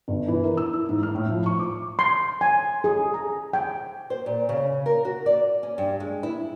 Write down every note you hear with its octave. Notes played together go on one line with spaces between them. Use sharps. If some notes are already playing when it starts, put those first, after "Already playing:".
G1
E3
A#4
E6
E4
G#2
F6
A2
F3
C#6
D6
C6
G#5
G#4
A#5
G5
C5
A#2
C#3
A#4
F#4
D5
C#4
G2
G#3
E4